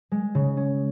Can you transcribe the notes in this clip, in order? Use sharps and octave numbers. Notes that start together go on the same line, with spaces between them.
G#3
C#3
C#4